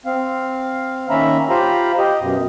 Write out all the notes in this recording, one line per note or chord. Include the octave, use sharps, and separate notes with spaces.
C4 F5
D#3 A#3 C#4 E5 A#5 B5
F4 G4 C5 F5 A#5 B5
G4 D#5
F#2 B2